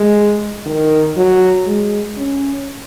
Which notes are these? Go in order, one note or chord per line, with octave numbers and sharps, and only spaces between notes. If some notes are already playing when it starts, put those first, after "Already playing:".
Already playing: G#3
D#3
F#3
G#3
C#4